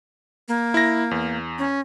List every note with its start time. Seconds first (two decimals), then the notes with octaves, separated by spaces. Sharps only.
0.48 A#3
0.74 E4 A#6
1.11 E2
1.59 C#4